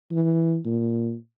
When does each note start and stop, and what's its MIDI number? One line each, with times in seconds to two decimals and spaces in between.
0.12 0.58 52
0.65 1.15 46